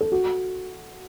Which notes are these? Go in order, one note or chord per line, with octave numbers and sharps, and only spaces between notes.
A4
F#4